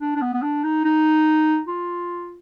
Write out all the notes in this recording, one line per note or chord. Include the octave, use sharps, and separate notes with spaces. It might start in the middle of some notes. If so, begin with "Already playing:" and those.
D4
D4
B3
B3
D4
D#4
D#4
F4